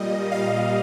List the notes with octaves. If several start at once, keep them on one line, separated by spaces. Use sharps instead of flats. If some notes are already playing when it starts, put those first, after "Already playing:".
Already playing: A#2 G3 D#5
F5